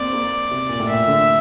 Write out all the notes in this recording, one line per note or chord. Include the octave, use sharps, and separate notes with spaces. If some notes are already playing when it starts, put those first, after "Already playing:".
Already playing: A#3 C4 D5
A#3
C3
A#2
A2
A#2 E5
D3